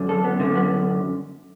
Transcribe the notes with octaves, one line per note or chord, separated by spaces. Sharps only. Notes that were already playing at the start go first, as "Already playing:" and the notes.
Already playing: F#2 D3
A4
B3
F#2 D3 A3
B3